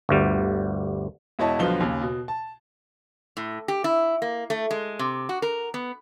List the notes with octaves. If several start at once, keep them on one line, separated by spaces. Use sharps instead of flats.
G1 D2 G3
E1 E4 C#5 D#5 A5
B1 B2 D3 F3 B3 G7
D#2 C#3
B2
A5
A2
G4
E4
A#3
A3
G#3
C3
F#4
A#4
B3